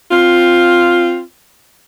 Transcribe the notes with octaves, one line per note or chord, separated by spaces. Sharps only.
C4 F4